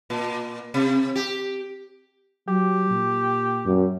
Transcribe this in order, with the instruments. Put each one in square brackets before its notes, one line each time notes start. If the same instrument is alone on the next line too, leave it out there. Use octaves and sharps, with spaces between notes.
[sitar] A#2
C3
G4
[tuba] F#3 [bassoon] G4
[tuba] A#2
[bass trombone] F#2